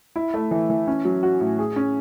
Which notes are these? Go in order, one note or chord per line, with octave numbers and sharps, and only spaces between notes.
E4
A3
E3
E3
C#4
F#3
F#4
A2
G#4
C#4